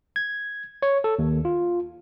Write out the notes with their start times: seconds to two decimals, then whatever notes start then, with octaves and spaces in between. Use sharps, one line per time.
0.16 G#6
0.82 C#5
1.04 A4
1.19 D#2
1.45 F4